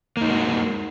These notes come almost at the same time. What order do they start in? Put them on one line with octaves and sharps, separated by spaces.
A#3 D#4 G#3 F#4